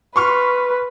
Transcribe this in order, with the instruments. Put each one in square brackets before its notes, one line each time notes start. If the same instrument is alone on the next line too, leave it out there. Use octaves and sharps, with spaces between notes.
[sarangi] B4 [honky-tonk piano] C6 C#6 F6